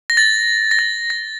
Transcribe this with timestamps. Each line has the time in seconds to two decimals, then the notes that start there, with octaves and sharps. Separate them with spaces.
0.10 A#6
0.17 A6
0.71 A#6
0.79 A6
1.10 A#6